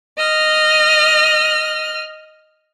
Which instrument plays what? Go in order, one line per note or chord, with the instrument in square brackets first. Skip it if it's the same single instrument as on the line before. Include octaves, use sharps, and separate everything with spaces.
[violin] D#5 F6